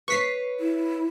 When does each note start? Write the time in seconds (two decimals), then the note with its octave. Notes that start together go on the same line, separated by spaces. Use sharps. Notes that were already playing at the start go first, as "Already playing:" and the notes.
0.08 B4 C#5 C#6 B6 C7
0.60 E4